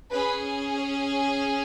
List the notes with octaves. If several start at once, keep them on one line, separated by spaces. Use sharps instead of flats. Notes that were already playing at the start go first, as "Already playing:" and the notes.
C#4 G#4 B4
C#5